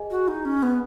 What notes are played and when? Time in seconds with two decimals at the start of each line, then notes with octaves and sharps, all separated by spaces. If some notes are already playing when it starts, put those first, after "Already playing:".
Already playing: G#4 D#5 G#5
0.11 F#4
0.28 D#4
0.45 C#4
0.63 B3